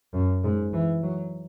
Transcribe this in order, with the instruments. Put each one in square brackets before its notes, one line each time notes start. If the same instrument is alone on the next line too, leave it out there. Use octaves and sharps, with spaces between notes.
[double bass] F#2
G#2
E3
F#3